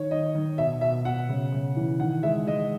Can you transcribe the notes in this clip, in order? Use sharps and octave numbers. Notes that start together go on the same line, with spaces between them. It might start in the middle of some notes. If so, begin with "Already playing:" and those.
Already playing: D#3 C#5
D#3 D#5
D#3
B2 E5
B2 E5
B2 F#5
C#3
C#3
E3
D#3 F#5
G#3 E5
G#3 D#5